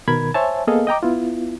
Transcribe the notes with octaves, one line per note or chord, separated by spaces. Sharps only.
B2 D#3 A#4 B5 G#6
C5 C#5 E5 G#5 A5
A#3 B3 G#4 A4 D#5 F5
D#5 G5 A#5 D6
B3 E4 F4